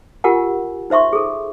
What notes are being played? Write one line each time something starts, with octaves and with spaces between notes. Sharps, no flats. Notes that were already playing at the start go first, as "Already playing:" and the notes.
F4 G4 A#4 F#5 G#5
D#4 C5 E5 C6 C#6
G#4 A4